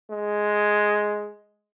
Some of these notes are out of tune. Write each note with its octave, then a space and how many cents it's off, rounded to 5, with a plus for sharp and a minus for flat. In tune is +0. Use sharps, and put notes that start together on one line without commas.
G#3 +5